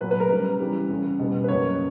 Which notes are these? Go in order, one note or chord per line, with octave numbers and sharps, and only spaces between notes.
A#2 F#3 B3 B4
B4
A#4
C#3 G3 B3 B4
C#3 E3 G3
E2 C#3 G3
B2 G3 B3
B4
F#2 C#3 F#3 A#3 C#5